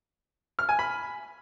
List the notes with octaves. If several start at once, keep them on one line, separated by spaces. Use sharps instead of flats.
F6
G#5
B5